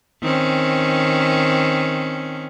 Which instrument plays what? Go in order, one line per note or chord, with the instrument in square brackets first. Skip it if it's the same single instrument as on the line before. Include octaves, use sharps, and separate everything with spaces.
[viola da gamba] D#3 C4 C#4